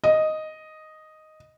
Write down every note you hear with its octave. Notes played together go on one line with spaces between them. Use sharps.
D#5